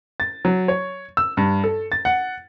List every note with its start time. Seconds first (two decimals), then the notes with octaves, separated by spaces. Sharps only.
0.20 A6
0.45 F#3
0.68 C#5
1.17 E6
1.37 G2
1.64 A4
1.92 A6
2.05 F#5